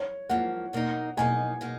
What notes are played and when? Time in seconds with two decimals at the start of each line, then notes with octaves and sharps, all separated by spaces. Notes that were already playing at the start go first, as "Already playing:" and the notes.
Already playing: C#5
0.29 G#2 F3 A#3 F#5
0.73 B2 A#3 D#4
1.17 B2 A#3 D#4 G#5
1.61 B2 A#3 D#4